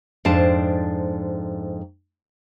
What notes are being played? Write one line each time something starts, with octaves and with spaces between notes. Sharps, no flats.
F2 G#2 D4 C5 A5